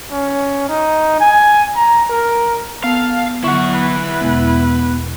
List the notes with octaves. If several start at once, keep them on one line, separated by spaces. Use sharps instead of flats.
C#4
D#4
G#5
A#5
A#4
B3 A4 F5
D3 F#3 E4 F#5 C#6
B4
E2 B2 G#3 B3